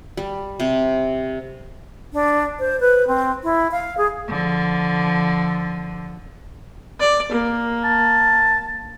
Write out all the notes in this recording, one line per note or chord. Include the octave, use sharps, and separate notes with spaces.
G3
C3
D4
C5
B4
C4
E4
F5
G#4
D3 F3
D5
A#3
A5